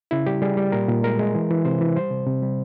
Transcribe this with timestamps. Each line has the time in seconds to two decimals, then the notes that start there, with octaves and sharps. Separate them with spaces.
0.11 C#3 E4
0.26 G3 G4
0.42 G3 G#4
0.57 G3
0.72 A#2 A#4
0.88 A#2
1.03 G#3 A#4
1.19 G#3
1.35 E3
1.50 E3
1.65 C3 C5
1.81 E3
1.96 G3 C5
2.11 C3
2.27 C3
2.42 G3